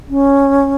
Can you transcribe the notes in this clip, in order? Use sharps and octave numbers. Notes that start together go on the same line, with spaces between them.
C#4